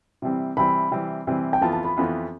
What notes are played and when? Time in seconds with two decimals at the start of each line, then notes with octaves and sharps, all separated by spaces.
0.22 C3 E3 G3 C4
0.57 C3 E3 G3 C4 B5
0.91 C3 E3 G3 C4
1.27 C3 E3 G3 C4
1.53 G5
1.61 F2 E3 B3 F4 A5
1.73 A5
1.85 B5
1.97 F2 E3 B3 F4